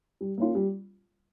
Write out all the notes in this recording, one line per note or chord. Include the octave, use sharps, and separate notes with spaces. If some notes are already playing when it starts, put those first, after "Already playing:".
G3
A#3 C#4 F4
G3